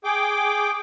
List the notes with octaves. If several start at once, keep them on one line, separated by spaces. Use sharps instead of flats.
G#4 G5 D6